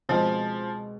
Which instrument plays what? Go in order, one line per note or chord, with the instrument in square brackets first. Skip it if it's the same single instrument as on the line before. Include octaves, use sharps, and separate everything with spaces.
[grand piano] B2 G#3 C4 [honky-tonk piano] F3